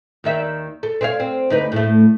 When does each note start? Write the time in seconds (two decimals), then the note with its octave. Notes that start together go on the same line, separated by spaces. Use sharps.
0.24 D#2 D#3 E5
0.83 A4
1.01 C4 C#5 F5
1.20 C4
1.50 D2 D#4 B4
1.72 A2 A3